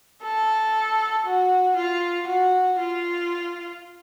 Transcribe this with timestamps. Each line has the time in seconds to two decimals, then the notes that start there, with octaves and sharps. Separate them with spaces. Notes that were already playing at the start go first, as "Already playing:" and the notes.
0.23 A4
1.26 F#4
1.76 F4
2.27 F#4
2.79 F4